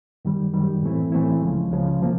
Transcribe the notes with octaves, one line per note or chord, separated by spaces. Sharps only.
F#2 D#3 G3
F#2 D#3 G3
A2 E3 A3 C4 E4
A2 E3 A3 C4 E4
C#2 C#3 F3 G#3
C#2 C#3 F3 G#3
C3 F3 A#3